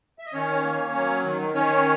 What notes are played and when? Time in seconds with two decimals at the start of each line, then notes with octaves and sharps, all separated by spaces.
0.19 E5
0.26 D#5
0.33 D#3 C#4 C#5
0.64 A#3
0.94 F#3
1.24 D#3
1.54 D#3 C#4 C#5